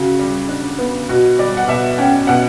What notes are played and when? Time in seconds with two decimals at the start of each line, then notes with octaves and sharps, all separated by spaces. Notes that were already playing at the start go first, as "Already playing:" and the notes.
Already playing: C#3 F#4
0.19 G3
0.48 D4
0.79 B3
1.09 B2 F#4
1.38 G3 D5
1.57 F#5
1.68 B2 E5
1.98 C#4 G5
2.27 B2 F#5